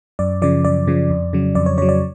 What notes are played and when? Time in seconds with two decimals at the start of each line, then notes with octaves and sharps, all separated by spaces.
0.19 F#2 D5
0.42 C#3 F3 D5
0.65 F#2 D5
0.87 C#3 F3
1.10 F2
1.33 C#3 F#3
1.55 F2 D5
1.66 C#5
1.78 C#3 F#3 C#5
1.89 D5